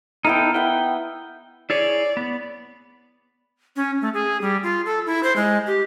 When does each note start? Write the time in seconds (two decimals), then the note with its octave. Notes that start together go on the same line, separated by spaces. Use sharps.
0.25 B3 D#4 E4 A4 A#4 G5
0.54 B4 F#5 G5
1.70 E4 G#4 C#5 D5
2.17 B3
3.76 C#4
4.01 A3
4.14 G#4
4.41 G3
4.63 F4
4.86 A4
5.06 E4
5.23 C5
5.36 G#3
5.67 G4